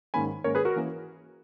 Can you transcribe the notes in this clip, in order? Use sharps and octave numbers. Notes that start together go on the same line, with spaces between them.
G#2 D#3 A#3 C#4 G#5 B5
G#2 D#3 A#3 C#4 A#4 C#5
G#4 B4
F#4 A#4
E3 A#3 C#4